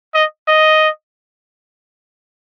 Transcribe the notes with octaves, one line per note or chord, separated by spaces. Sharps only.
D#5
D#5